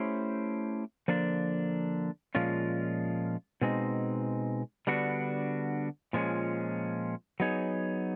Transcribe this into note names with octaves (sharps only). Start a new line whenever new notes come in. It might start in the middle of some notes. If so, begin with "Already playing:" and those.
Already playing: A3 C#4 E4 G4 C5
D3 F3 A#3 D4
A#2 F3 G#3 C#4 F4
B2 G#3 C4 D#4
D3 G3 B3 D4 F#4
A#2 F3 G#3 C#4
F#3 B3 D#4 G#4 C#5